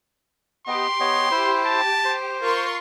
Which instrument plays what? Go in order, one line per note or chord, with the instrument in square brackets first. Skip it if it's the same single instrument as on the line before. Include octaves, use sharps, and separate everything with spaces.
[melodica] B3 D#5 [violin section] G4 [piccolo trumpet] C6
[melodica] B3 C#5 D#5
E4 C5
[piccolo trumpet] A5
[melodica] C5
[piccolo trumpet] F4 [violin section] A#4 C6 C#6